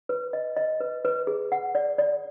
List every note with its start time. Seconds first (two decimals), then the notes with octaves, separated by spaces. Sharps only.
0.09 B4
0.33 D#5
0.56 D#5
0.80 B4
1.05 B4
1.27 G#4
1.52 F#5
1.75 D5
1.98 D5